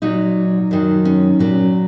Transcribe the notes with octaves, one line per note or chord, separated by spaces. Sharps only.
A#2 F#3 D#4
F#2 D#3 F#3
C#4
A#2 F#3 C#4